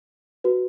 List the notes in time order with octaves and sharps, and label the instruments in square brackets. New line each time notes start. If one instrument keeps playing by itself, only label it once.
[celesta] F#4 B4